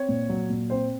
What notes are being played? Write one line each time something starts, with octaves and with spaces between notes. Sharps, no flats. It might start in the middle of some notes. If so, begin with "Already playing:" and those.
Already playing: C4 C#5
A#2
F#3
A#2
C4 C5